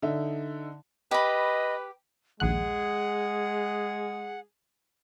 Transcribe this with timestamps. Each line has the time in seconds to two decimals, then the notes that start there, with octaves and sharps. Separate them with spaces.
0.02 D3 D#4 E5
1.11 G4 B4 D#5 B5
2.40 A#1 D#2 G#3 G#4 F#5 F#6